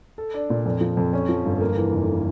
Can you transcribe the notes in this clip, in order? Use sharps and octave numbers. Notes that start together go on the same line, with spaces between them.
A4
D4
A#2
F2
F3
F2
C#4
F3
G1
A#3
E3
F1